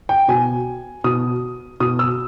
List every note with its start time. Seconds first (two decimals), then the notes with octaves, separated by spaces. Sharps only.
0.09 G5
0.28 B2 G#5
1.04 B2 D#6
1.80 B2 D#6
1.99 E6